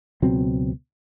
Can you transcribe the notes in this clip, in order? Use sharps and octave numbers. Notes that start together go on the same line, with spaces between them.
C#2 B2 F#3 C4